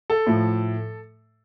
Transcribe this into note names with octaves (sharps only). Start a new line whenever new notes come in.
A4
A2 F3 A3